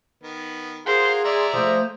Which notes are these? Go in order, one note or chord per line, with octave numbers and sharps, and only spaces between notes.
D#3 B3
F4 F#4 G#4 A#4 C5 C6
G#3 D5 E5 A#5
F3 A3 C6 D#6 G6